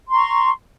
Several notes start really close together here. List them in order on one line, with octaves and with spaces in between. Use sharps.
C6 A#5 C#6